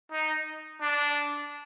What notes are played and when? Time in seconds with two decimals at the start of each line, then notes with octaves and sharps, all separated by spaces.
0.12 D#4
0.82 D4